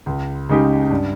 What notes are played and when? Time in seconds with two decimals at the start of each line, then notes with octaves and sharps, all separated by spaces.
0.06 C#2
0.49 C#3 G#3 D#4 G4
0.90 G2